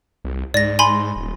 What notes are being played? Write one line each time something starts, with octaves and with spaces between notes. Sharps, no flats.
C2
G#2 D5 A#6
G#5 B5 C6
D#1